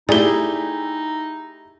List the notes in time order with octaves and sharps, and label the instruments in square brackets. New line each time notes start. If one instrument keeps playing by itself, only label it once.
[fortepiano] A3 E4 G4 [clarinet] D#4 [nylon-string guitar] G#4 [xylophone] D5 G7